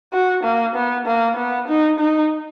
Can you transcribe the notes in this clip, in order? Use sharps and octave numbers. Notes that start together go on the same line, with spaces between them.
F#4
A#3
B3
A#3
B3
D#4
D#4